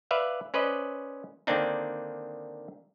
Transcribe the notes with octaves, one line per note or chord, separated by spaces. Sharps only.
B4 D5 E5 F5
C#4 B4 C5 D5 D#5
D3 D#3 A#3 C4 D4 D#4